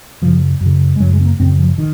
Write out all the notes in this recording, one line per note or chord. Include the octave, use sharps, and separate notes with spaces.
F#2 C#3 F3
F#2
C#3
G#3
F#2 C#3 F#3
G#3
C4
A#3
F#2 C#3 C4
F3
D#3